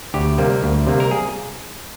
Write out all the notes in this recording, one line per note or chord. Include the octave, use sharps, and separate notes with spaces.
D2 G4
C3 G3 A#3
D2
C3 G3 A#3
A#4
G#4